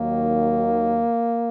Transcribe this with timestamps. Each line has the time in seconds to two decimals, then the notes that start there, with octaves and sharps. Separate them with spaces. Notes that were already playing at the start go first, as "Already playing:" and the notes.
Already playing: D#2 D#3 F#3 A#3